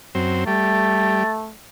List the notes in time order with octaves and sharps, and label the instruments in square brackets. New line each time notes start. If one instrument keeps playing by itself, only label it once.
[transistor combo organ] F#2 C4
[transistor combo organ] G3 [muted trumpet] A3 [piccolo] A6